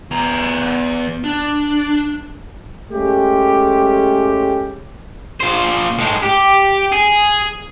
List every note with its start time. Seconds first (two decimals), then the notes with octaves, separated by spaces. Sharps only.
0.11 E2 A#5
1.24 D4
2.92 G#3 A3 C#4 G4
5.40 A#2 C5
5.99 A2 G#3
6.23 G4
6.92 G#4